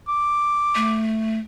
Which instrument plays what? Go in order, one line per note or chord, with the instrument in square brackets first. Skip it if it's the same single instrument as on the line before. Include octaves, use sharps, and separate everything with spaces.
[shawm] D6
[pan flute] A3